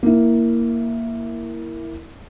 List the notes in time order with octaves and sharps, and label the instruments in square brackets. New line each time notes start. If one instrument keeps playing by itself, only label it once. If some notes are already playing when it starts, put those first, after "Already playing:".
[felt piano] A#3 E4